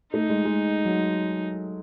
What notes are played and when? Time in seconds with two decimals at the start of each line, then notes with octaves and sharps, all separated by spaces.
0.13 A3 D#4
0.29 G#3
0.45 G#3
0.85 F#3